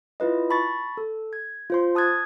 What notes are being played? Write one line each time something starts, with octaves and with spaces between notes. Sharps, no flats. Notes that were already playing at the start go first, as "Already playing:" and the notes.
E4 F4 B4 D#5
A5 B5 C#6 A6
A4
G#6
F4 C5 C6
A5 D#6 F#6 G#6 A6